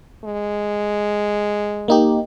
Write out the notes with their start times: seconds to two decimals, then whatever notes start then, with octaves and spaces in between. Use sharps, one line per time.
0.25 G#3
1.88 A#3 D#4 G4